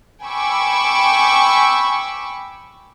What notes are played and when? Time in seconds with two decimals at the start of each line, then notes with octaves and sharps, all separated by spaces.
0.23 G5 G#5 B5 C#6 D6 E6